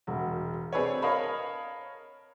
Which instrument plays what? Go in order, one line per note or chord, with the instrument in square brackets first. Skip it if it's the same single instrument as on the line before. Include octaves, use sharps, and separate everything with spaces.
[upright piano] E1 F#4
C4 D4 G#4 A4 B4 C#5
A#4 C#5 D#5 F5 A5 B5